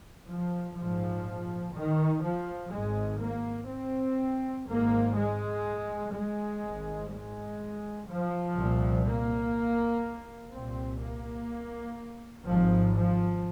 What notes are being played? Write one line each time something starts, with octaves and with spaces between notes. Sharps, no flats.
F3
A#1 G#2 F3
D#3
F3
G#1 G#2 G#3
A#3
C4
G#1 G#2 A#3
G#3
G#3
G#1 G#2
G#3
F3
C2 A#2
A#3
C2 A#2 C4
A#3
G#1 G#2 F3
F3